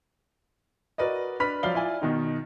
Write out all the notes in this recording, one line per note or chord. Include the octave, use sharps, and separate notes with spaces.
F#4 A#4 B4 D5 D#5
D4 B4 D5 B5 F6 B6
F3 F#3 D5 F5 F6 G7
E4 F4 D5 G#5
B2 D#3 D#4